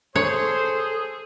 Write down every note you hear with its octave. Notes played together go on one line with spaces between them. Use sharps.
G#4 A4 C5 C#5